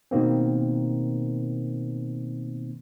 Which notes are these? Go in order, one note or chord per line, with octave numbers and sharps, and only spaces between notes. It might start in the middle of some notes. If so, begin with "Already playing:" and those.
B2 D#3 A#3 C4